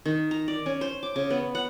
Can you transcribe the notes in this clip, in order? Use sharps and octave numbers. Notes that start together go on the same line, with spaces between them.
D#3
A#5
D5
C#4
C5
D6
C#3
B3
F#5